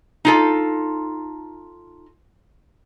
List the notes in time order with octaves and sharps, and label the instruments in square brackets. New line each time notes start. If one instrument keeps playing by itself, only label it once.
[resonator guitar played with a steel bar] D#4 F4 A4